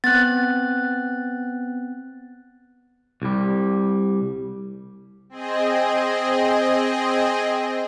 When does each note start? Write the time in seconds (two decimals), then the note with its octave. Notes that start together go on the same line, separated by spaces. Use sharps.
0.04 B3 C4 F#6 A6
3.22 C2 G3
5.29 C4 G#4 D#5